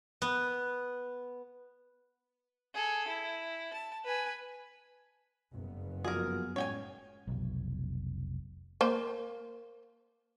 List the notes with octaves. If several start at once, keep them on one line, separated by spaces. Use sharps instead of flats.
B3
G#4 A4
E4
A5
B4 G#5
F#1 G2 B3
F3 F4 F#4 G#4 A#4
A2 G#3 C#4 C#5 G5 G#5
F1 B1
A#3 C5